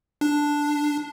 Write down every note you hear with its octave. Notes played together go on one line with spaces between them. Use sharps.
D4